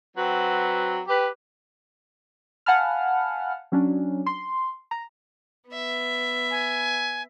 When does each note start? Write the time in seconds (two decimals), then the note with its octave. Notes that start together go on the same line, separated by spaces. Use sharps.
0.15 F#3 C4 F#4 B4
1.07 G4 B4
2.66 F5 F#5 G#5 A5 B5 F6
3.72 F#3 C#4 D4
4.26 C6
4.91 A#5
5.70 B3 E5
6.51 G#5